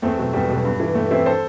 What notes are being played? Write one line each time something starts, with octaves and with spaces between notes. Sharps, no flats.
E2 A3 C4
B2 F#3
E2 G3
B2 F#3
G2
E3
G2 A3
E3 C4 E4
A4 C5